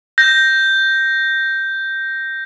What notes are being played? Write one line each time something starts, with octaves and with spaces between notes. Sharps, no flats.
G6 A#6